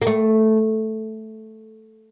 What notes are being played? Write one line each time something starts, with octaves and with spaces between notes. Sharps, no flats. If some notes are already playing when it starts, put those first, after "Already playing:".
A#3
A3